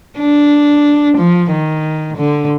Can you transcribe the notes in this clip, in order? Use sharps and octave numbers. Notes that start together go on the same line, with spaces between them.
D4
F3
D#3
D3